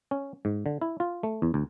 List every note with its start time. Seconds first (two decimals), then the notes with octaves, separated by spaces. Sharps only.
0.11 C#4
0.45 G#2
0.66 D3
0.81 E4
1.00 F4
1.23 A3
1.42 E2
1.54 D2